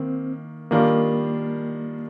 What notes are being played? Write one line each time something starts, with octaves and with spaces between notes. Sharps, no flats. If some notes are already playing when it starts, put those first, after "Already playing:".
Already playing: D#3 A#3 C4
D#3 G3 A#3 D4 F4 A#4